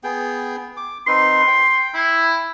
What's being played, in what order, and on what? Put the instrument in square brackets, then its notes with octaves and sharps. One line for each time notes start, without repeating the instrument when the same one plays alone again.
[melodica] B3 G#4 G5
D6
[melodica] C4 D#4 B4 [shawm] C6
[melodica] G5
[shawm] E4